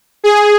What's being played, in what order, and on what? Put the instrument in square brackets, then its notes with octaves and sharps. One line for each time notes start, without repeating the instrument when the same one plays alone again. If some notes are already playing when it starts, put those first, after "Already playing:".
[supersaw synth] G#4